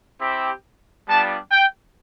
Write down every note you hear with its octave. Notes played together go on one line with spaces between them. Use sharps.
C4 E4 G4
G3 B3 D4 F4 A5
G5